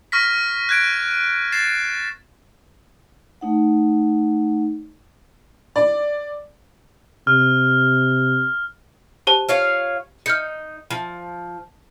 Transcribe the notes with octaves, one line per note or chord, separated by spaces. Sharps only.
C#6 F6 A#6 B6
F#6 G#6 D7
A6 C7 E7
A3 D#4 F#5
D5
C3 F6
G4 C5 A5
F4 C#5 F5
D#4 F6 G6 C#7
F3